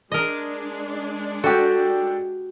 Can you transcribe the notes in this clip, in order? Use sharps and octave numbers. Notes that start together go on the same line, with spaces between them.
G#3 D4 A#4 D#5
F#4 G4 A4 G5